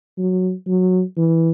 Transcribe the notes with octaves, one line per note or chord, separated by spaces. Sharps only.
F#3
F#3
E3